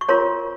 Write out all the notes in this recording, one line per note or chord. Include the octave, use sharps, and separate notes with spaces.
C#6
F4 A#4 C#5 A#5 C6